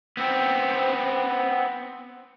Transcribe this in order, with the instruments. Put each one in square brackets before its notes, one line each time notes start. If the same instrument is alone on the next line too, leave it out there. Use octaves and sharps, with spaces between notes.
[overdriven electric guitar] B3 C4